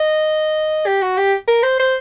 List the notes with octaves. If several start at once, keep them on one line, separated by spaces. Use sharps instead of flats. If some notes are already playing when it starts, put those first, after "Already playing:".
Already playing: D#5
G4
F#4
G4
A#4
C5
C5